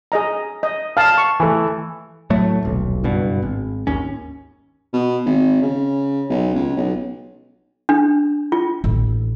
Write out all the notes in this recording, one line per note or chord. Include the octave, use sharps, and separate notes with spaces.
G#4 D#5 A#5
D#5
F5 A5 F6
C#6
E3 A3
A2 F#3 A3
D#1 B1
F#1 G2 B2
G#1
G#1 D#2 C#4
B2
G#1
C#3
B1
C#2
B1
D4
F4
A1